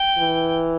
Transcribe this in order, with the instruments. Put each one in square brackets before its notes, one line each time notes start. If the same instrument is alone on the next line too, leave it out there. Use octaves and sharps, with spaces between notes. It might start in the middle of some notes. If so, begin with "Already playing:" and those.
Already playing: [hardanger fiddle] G5
[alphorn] E3